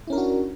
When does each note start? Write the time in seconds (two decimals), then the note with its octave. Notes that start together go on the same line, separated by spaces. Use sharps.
0.07 E4
0.10 C#4
0.13 A#4
0.15 D4
0.18 F#4